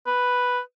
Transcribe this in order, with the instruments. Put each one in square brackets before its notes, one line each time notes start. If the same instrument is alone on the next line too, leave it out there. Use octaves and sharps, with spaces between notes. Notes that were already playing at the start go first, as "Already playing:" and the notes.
[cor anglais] B4